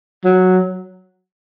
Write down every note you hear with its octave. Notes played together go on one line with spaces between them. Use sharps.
F#3